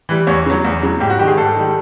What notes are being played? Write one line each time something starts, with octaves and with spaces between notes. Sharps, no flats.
E3 G3
E2 C#5
C#3 F#3
E2
C#3 F#3
G#2 G4
F#4
D#3 G3 G4
G#4
G#2 A4
D#3 G3